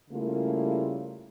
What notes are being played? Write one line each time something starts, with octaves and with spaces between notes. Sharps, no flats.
C#3 G3 A3 A#3 E4 F4